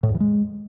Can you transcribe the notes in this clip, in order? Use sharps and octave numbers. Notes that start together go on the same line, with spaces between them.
A2
E2
E3
G#3